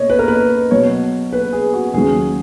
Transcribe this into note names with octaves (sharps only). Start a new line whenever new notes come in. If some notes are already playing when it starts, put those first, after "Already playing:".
Already playing: B2 A#3 C#5 D#5
B4
A#4
B4
B2 F#3 B3 C#5
B4
G#4
F#4
D#2 C#3 F#3 G#4